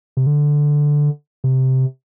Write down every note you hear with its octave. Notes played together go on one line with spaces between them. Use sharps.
C3
D3
C3